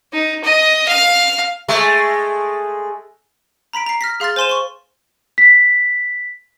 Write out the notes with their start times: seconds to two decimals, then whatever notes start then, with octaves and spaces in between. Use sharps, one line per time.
0.13 D#4
0.44 D#5
0.88 F5
1.68 G#3 A3
3.73 A#5 B5 B6 D7
3.86 A#5 C7
4.01 F6 A#6 B6
4.20 G#4 F5 C6 F6 A6
4.36 C5 G#5 C6 D#7 E7
4.49 C6 C#6
5.38 B6